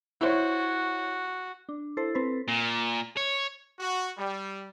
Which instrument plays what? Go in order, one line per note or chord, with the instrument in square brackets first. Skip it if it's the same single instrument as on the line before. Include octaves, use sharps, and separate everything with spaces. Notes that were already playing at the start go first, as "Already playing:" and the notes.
[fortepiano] E4 C5 C#5 [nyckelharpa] F#4
[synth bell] D4
E4 A4 C5
C4 A4 B4 C5
[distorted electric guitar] A#2
C#5
[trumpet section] F#4
G3